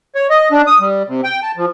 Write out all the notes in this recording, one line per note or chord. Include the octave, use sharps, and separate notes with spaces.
C#5
D#5
D4
D#6
G3
C3
G5
A5
F3